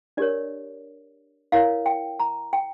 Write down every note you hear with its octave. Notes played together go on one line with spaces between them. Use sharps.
D4 G4 A#4 C#5 D5
E4 A#4 C#5 F5
G5
A#5
G5